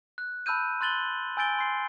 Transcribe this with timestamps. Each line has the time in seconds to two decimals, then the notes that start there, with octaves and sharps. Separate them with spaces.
0.18 F#6
0.46 A5 B5 E6 F#6 G6 D#7
0.81 C6 F#6 A6 F#7 G7
1.37 G#5 E6 G6 A6 D7 G7
1.59 C6 C7